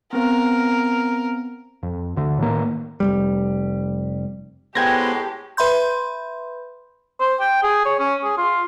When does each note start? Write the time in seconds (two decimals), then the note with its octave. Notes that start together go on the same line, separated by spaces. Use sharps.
0.13 B3 C4 A#4 F5
1.83 F2
2.16 D2 D3
2.38 A2 D#3 A#3
3.00 F1 D#2 G3
4.75 A2 G#3 B3 G4 C5 G5 G#6 A#6
5.57 B4 E5 B5 C6 G6
7.20 C5
7.40 G5
7.63 G#4
7.85 C#5
7.99 C#4
8.24 G#4
8.37 F4